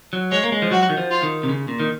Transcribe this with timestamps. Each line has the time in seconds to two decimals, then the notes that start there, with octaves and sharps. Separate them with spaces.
0.13 F#3
0.31 G#3 C#5
0.44 A#3
0.52 G#3
0.62 F3
0.71 F#3 F#4
0.90 D#3
0.97 F3
1.10 F4
1.23 D#3
1.43 C3
1.49 C#3
1.68 A#2
1.80 D#3